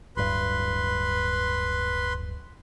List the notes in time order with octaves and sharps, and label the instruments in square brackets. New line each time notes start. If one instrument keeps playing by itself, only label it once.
[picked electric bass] D1 G2 [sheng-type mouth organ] B4 B5 C6